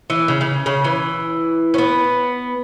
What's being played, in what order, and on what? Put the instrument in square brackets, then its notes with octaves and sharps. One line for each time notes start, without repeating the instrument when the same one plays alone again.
[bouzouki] E3
C#3
C#3
C#3
E3
C#4
B3